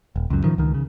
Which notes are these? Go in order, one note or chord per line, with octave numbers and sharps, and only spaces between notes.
D#1
C#2 F#2
A2 D#3 F3
C#2 D#3
C#3